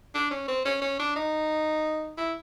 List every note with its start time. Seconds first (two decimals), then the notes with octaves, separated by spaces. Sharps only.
0.15 D4
0.31 C#4
0.48 C4
0.65 C#4
0.82 C#4
1.00 D4
1.16 D#4
2.18 E4